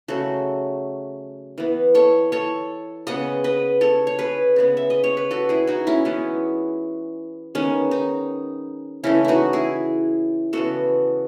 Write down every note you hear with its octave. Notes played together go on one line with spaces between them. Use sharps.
C#3 F#3 A3 F#4 A4
E3 B3
A4 C#5
A4 C#5
C#3 G#3 B3 D#5 F#5
B4 D#5
A4 C#5
C#5
G#4 B4
C#3 G#3 B3
E5
D#5
C#5
B4
F#4 A4
E4 G#4
D#4 F#4
C#4 E4
E3 G#3 B3 C#4
D#3 G#3 B3 C#4
D#4
C#3 E3 A3 C#4 E4
D#4 E4 F#4
E4 G#4
C#3 E3 G#3 B3 F#4 A4